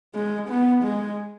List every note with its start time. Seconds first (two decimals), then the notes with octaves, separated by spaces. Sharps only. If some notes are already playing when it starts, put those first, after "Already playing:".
0.14 G#3
0.49 B3
0.84 G#3